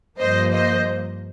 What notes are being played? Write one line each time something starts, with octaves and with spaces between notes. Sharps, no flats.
G2 F3 A#3 C5 D#5
C5 D#5